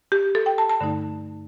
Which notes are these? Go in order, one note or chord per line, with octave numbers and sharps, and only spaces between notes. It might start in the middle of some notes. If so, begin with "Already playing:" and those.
G4
A4
G5
A5
A5
G2 D3 A3 D#4